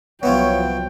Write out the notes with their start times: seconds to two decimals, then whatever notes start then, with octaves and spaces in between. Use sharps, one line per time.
0.23 C2 F3 F#3 B3 E4 F4 C#5 G5